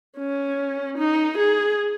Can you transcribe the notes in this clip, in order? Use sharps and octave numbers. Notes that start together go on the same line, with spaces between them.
C#4
D#4
G#4